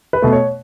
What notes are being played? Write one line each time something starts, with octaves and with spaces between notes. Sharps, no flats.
B4
B2 A3
C#5